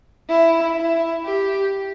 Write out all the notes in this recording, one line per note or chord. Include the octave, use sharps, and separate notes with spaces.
E4
E4
G4